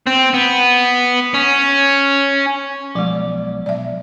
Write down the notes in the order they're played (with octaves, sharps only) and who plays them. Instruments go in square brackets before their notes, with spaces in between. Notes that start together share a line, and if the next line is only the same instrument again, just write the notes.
[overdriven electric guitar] C4
B3
C#4
[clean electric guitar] B1 D5 [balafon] F3 G#3
[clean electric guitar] B1 [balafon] D5 E5